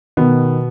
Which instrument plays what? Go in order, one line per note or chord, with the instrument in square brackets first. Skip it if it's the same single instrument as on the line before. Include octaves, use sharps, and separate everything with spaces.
[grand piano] B2 D#3 B3